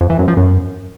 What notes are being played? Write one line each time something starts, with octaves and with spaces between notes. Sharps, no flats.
F2
E3
F#2
F3
F#2